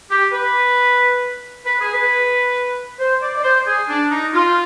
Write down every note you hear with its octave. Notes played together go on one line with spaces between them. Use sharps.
G4
B4
B4
G#4
B4
C5
D5
D5
C5
G#4
D4
D#4
F4